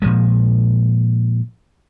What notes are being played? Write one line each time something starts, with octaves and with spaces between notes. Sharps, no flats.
A#2 F3 G#3